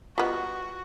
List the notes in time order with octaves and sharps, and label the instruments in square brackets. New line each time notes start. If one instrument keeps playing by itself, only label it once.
[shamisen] G3 B3 [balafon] F4 D#5 [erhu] F#4